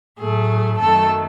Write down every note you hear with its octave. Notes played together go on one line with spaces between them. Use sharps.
A2 F#3 A3 G#4
F#2 D#3 F#3 A3 A4